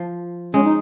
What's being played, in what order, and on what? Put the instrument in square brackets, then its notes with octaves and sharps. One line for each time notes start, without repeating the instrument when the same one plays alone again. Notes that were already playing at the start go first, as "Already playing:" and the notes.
Already playing: [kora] F3
[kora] G#3 [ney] C#4
[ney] D#4